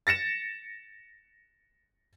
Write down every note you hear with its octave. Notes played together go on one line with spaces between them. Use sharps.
A6 A#6 C#7 E7